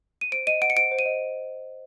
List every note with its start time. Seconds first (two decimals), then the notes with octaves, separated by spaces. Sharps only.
0.21 D#7
0.32 C5 D7
0.47 D#5 D#7
0.62 F#5 D7
0.70 C#7
0.76 C5 D7
0.91 C5
0.99 D#7
1.06 D#5